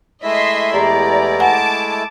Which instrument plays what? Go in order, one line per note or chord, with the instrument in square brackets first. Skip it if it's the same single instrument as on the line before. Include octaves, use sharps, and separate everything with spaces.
[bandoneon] G#3 A3 E4 [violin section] D#5 E5 C6
[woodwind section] E2 G4 A#5 [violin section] D5
[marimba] F#5 G#5 [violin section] A5 D6